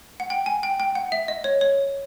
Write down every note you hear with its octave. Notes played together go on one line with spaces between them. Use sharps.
F#5
G5
G#5
G5
G5
F#5
E5
D#5
C#5
C#5